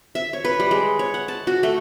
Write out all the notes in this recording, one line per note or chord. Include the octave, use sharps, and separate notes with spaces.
E5
C#5
B4
G3
G#3
C#5
F#5
A5
F#4
A3